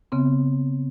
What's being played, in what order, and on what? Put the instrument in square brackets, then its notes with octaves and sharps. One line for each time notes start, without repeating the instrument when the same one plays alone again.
[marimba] C#3 B3 C4